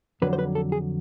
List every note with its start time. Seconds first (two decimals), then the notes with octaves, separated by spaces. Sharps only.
0.22 F2 D3 F#3 B4
0.33 C5
0.39 B4
0.55 A4
0.72 G#4